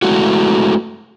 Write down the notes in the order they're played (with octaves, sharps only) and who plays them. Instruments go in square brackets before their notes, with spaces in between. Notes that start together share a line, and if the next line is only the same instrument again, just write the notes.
[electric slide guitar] G#3 A3 E4 F#4